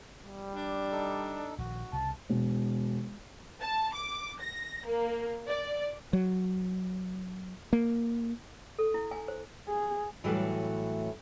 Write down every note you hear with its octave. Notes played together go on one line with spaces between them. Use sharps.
G3
D4
D#4 A4
A#1 D#3 F#4
C2 C#3 A5
E1
A5
D6
A#6
A#3
D5
F#3
A#3
A4
E4
G#5
C5
G#4
A2 E3 F#3 G3 A3